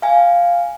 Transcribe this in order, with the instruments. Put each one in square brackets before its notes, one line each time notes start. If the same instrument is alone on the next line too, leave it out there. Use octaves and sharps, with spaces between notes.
[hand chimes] F5 G#5